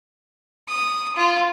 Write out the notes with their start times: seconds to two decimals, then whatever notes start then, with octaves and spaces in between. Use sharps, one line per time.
0.68 D#6
1.16 F4